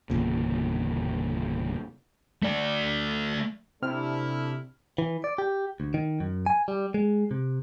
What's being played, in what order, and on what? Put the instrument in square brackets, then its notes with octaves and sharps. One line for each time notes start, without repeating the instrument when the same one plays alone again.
[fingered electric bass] G1 E2 A#2 C#3
[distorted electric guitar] A3 D5
[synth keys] C3 F6 [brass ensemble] A3 D4 E4
[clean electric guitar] E3
D5
G4
D2
D#3
F#2
G#5
G3
G#3
C3